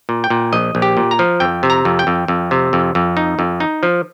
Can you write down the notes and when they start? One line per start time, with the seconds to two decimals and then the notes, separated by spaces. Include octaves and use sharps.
0.09 A#2
0.24 G5
0.30 A#2
0.53 A#1 D#5
0.75 A#1
0.82 G4
0.97 A#2
1.11 A#5
1.19 F3
1.40 F2 G5
1.63 C3
1.70 A#5
1.85 F2
1.99 G5
2.07 F2
2.28 F2
2.51 C3
2.73 F2
2.95 F2
3.17 D#4
3.39 F2
3.60 D#4
3.83 F3